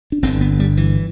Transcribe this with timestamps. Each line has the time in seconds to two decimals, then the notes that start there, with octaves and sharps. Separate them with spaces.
0.12 D4
0.22 G1 G2 D3 C4
0.41 B3
0.60 G3
0.77 E3